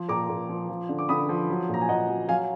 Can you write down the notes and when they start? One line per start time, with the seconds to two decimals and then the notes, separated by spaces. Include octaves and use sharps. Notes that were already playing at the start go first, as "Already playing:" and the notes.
Already playing: F3
0.09 A#2 A#5 D6
0.29 A#2
0.49 F3
0.69 F3
0.89 D3
0.99 D6
1.09 D3 B5 D#6
1.29 F3
1.49 F#3
1.69 A#2 A#5
1.81 G#5
1.89 A#2 D#5 F#5
2.09 F#3
2.29 F#3 F5 G#5